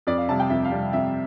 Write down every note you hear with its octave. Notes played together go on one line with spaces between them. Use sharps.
F2 D5
F5
C3 G3 A5
G5
F2 E5
F5
C3 G3
F2 E5